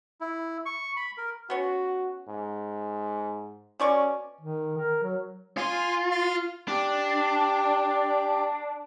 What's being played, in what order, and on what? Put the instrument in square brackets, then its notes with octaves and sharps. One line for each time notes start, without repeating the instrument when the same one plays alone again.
[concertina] E4
C#6
B5
A#4
[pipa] B3 C#4 [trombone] F#4
[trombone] G#2
[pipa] B2 D5 C#6 [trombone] C#4
[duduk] D#3
A#4
F#3
[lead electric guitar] F4 [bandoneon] G#5 C6
[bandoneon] F5 C6 F6
[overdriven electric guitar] D4 [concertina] G4